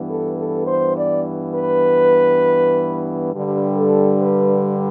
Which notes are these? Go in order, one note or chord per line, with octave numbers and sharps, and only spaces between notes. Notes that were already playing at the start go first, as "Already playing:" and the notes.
Already playing: G2 E3 B3
A4
A4
C5
D5
B4
G2 D3 G3
A4
B4